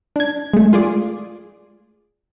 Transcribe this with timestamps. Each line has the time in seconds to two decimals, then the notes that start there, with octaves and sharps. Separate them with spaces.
0.16 D4 G#6
0.53 G#3 A3
0.73 F4 G#4 D5